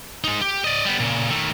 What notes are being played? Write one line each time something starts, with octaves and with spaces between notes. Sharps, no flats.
G#3 D#4
G4
D5 D#5
G3 B3
A#2 C#3
D#3 A3